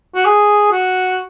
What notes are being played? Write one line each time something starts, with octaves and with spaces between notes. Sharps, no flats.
F#4
G#4
F#4